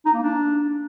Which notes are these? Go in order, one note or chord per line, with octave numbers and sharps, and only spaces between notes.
D#4
A#3
D4